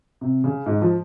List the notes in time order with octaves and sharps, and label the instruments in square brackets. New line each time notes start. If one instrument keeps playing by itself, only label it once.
[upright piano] C3
C#3
G#2
F3